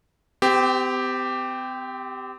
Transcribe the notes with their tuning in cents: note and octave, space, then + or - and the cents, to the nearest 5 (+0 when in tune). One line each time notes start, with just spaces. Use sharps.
C4 -40 G4 +0